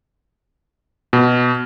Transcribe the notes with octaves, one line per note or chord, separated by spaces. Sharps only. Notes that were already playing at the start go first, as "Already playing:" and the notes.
B2